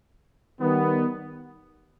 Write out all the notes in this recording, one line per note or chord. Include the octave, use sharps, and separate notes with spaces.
D#3 G3 B3